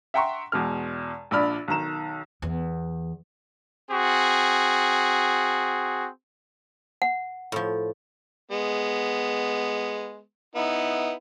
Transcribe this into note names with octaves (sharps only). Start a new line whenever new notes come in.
E5 F#5 G5 A#5 C6 C#6
E2 B2 G#3 F6
A#1 A#2 D4 D5 B5 F6
B1 D#3 A#5 E7
E2
C4 F#4 G#4
F#5
A2 F3
G#3 B3
B3 D#4 E4